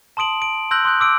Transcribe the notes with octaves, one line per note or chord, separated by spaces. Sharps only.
A5 C6 D#6 D7 F#7
D7
C6 E6 F#6 G6 A#6 F#7
C6 D#6 F#6 G6
D6 E6 D7